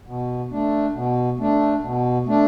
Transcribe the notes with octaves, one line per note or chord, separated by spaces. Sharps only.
B2
A3 D4
B2
A3 D4
B2
A3 D4